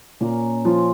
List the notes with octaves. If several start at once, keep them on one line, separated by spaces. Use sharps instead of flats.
A#2 A#3 C#4
F3 C#4 F4